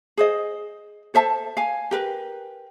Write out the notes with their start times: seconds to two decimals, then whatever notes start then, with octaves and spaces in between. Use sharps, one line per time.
0.17 G#4 C5 D#5
1.14 A4 C5 E5 A5
1.57 F5 G#5
1.91 G4 A#4 B4